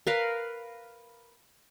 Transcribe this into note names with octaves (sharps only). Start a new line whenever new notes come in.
A#4 B4 F5